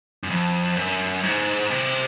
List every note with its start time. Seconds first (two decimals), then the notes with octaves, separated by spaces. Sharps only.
0.23 F#2
0.30 F2
0.77 F#2
1.23 G#2
1.70 C3